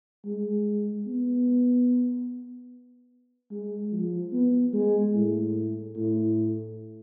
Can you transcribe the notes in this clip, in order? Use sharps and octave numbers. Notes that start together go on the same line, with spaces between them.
G#3
B3
G#3
F3
B3
G#3
A2
A2